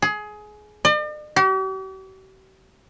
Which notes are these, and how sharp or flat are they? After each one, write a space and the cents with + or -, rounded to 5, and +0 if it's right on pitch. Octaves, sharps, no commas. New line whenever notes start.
G#4 +20
D5 +45
G4 -45